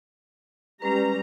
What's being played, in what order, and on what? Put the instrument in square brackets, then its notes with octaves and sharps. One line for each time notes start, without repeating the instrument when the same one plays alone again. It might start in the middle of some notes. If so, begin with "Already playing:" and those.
[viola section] G3 A#5 [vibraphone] G#3 C#4 B4